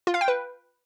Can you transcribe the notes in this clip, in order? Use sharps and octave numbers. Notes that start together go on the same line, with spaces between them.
F4
F5
G5
B4